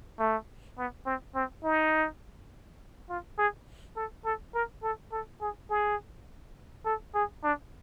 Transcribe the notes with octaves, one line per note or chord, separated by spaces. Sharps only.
A3
B3
C4
C4
D#4
F4
G#4
A4
A4
A#4
A4
A4
G#4
G#4
A4
G#4
D4